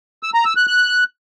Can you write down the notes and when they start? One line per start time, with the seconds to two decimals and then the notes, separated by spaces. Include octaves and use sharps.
0.23 E6
0.34 A#5
0.45 E6
0.56 F#6
0.67 F#6